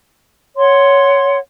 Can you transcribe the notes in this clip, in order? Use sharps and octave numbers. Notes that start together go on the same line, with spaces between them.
C#5 F#5 C6